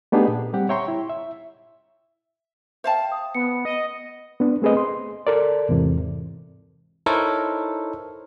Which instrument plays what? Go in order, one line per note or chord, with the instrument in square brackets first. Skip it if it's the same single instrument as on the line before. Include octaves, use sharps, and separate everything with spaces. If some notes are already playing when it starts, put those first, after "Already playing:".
[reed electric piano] A3 B3 D4 D#4 G4 G#4
A#2
G3 C4 G4 F#5
C#5 E5 G5 A#5 C6 C#6
E4
E5
[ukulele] C5 F5 A5 [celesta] E5 G5
[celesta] D#6
[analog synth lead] B3 [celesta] C#7
[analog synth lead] D#5
[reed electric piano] B3 D4
A3 C4 G#4 B4 D#5
C6
A4 A#4 D5
E2 G#2 C3 E3
[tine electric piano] D#4 E4 A4 A#4 C5 C#5